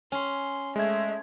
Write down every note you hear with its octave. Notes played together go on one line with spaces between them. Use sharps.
C#4 C6
G#3 A3 E5 G#6